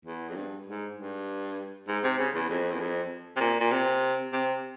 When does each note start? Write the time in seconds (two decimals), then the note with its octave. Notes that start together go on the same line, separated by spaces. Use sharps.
0.05 E2
0.29 F2
0.35 G2
0.66 G#2
0.96 G2
1.88 G#2
2.03 C3
2.19 C#3
2.34 E2
2.50 F2
2.72 E2
2.80 F2
3.36 C3
3.40 A#2
3.60 A#2
3.71 C3
4.32 C3